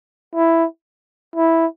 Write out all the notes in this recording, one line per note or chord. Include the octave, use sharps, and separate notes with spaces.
E4
E4